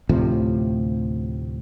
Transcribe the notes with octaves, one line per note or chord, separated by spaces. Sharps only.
D2 A2 C3 F3